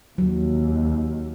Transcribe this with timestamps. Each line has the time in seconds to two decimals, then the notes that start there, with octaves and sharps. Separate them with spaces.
0.18 D#2 F#3